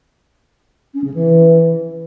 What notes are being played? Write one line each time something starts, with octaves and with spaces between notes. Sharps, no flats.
C#4
C#3
E3